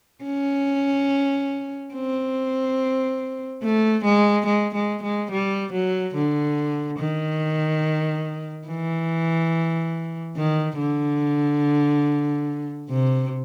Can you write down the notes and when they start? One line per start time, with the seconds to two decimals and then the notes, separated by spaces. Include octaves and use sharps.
0.25 C#4
1.94 C4
3.63 A3
4.05 G#3
4.46 G#3
4.75 G#3
5.03 G#3
5.31 G3
5.73 F#3
6.15 D3
6.99 D#3
8.68 E3
10.36 D#3
10.78 D3
12.90 C3